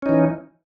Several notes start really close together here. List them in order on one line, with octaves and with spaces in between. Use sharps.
C#4 D#4 E3